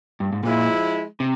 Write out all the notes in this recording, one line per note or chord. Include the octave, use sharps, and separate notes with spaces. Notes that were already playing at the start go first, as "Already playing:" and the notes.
G2
G#2
A#2 F3 G#3 E4
C3